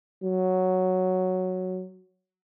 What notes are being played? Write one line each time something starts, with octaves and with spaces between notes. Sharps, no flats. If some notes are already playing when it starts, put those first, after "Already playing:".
F#3